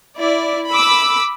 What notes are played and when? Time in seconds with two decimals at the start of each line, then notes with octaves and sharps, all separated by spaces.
0.17 E4 D5
0.70 B5 D6 E6